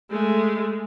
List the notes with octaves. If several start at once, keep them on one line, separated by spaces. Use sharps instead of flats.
G#3 A3